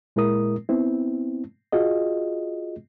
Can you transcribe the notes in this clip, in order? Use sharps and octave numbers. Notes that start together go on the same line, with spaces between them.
A#2 G#3 E4 A#4 D#6
B3 C4 E4
F4 F#4 G#4 D#5